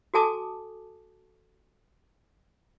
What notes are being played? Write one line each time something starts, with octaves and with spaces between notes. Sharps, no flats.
F#4 A4 G#5 A5 D6 D#6